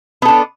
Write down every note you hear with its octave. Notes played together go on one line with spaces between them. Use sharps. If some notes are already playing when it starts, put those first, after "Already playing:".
B3 D4 A4